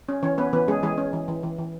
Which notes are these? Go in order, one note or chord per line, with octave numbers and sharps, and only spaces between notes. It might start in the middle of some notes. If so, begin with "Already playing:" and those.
C#4
E3 C#4 C#5
B3 C#4 B4
E3 B3 B4
G#3 C#4 G#4
E3 G#3 G#4
C#4
E3
E3
E3
E3